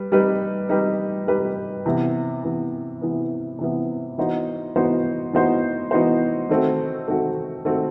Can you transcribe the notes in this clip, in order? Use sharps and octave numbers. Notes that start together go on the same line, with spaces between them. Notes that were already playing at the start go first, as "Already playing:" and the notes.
Already playing: G3 B4
G3 D#4 G4 B4
G3 D#4 G4 B4
G3 D#4 G4 B4
C3 E3 B3
C3 E3 B3
C3 E3 B3
C3 E3 B3
E3 B3 D#4 F#4 C5
E3 B3 D#4 F#4 C5
E3 B3 D#4 F#4 C5
E3 B3 D#4 F#4 C5
D#3 A3 C4 F#4
D#3 A3 C4 F#4
D#3 A3 C4 F#4